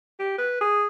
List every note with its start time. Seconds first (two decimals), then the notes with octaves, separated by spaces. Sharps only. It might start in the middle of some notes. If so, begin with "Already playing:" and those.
0.19 G4
0.38 B4
0.61 G#4